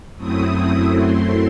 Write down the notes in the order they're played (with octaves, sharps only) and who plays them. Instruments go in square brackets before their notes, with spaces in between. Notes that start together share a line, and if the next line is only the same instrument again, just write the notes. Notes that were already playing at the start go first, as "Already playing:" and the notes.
[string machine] F#2 F#3 A3 C4 E4 D#6
C6